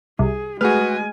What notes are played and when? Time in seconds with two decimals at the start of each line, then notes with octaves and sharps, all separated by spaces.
0.19 C2 G#4
0.61 G#3 A3 F#4 G#4 B4 G#5 F6